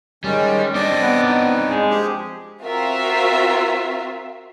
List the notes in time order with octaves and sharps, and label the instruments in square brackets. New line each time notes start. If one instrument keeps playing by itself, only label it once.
[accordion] D#3 G#3 C#4 [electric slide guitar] G3
[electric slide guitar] C4 D4 [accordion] D5 D#5 D6
[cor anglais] B3
[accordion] D#4
[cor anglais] G#3
[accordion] F3 G4 G#4
[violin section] C4 F4 F#4 A#4 E5 F5